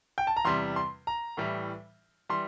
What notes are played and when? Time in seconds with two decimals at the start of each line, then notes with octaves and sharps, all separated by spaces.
0.18 G5
0.27 A5
0.37 A#5
0.45 E2 C3 G3 C6
0.76 C6
1.07 A#5
1.37 A2 E3 G3
2.29 E3 G3 C6